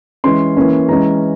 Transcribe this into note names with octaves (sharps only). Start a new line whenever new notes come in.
E3 G#3 C#4 C6
E3 A#3 C#4
E3 G#3 C#4 A#5